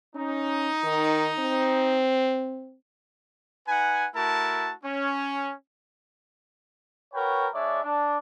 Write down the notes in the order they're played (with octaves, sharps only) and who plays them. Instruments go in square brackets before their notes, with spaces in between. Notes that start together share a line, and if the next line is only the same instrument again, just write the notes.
[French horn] C#4 [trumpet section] D#4
[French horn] D#3
C4
[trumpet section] D#4 B4 F#5 G#5
A3 E4 F#4 A#4 A5
C#4
F#4 A#4 B4 C#5 G5
G#3 D4 C#5 D5 E5
D4